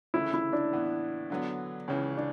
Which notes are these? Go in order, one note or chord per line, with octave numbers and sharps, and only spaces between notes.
D2 C#3 E3 A3 C#4 E4
E4
D4
A2 E3 B3
D3 F#3 B3
C#2 C#3 E3 C#4
D4